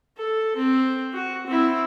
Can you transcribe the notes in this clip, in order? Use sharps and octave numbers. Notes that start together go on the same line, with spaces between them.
A4
C4
F#4
C4 E4